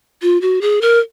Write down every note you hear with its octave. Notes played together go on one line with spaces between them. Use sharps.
F4
F#4
G#4
A#4